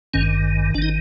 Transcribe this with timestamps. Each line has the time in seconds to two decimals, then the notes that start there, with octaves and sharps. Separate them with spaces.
0.14 G#1 G2 D#3 C#4
0.74 G#1 D4
0.78 D#3 D#4